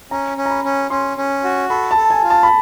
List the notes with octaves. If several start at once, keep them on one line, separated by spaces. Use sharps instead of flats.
C#4 A#5
C#4
A#5
B5
C#4
C#4 C6
C#4
F#4
A4 B5
A5
A4
G#5
F4
A5
B5